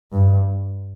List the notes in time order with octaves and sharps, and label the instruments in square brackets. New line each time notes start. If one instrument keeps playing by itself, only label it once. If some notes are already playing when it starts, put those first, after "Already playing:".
[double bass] G2